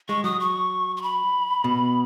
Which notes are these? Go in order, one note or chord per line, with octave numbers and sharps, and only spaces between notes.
G#3 C#6
F#3 D#6
C#6
C#6
B5
B2